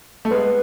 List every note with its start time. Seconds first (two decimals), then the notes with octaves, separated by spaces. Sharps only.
0.25 A3
0.31 G#3 B3 B4